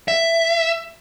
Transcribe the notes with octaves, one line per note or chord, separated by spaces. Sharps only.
E5